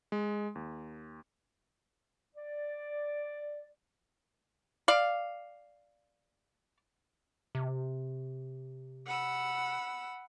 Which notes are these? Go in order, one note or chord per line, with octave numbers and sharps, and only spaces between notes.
G#3
D#2
D5
D5 F5
C3
F#5 B5 E6